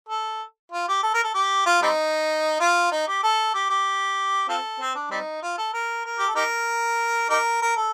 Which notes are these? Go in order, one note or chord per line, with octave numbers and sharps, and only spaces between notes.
A4
F4
G4
A4
A#4
A4
G4
F4
G3 C4 D#4
F4
D#4
G4
A4
G4
G4
C4 F4 A4
C4
D4
G3 C4 D#4
F4
A4
A#4
A#4
G4
A4
D#4 G4 A#4
D#4 G4 A#4
A#4
A4